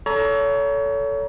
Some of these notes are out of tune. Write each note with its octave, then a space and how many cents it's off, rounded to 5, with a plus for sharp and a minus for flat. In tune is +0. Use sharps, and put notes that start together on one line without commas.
A4 +0 C#5 +30 A#5 +25